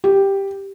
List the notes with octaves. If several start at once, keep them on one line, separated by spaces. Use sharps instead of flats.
G4